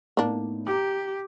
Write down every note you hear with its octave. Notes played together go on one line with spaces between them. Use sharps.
A2 A#3 B3 D4 D#4
G4 A#5 D6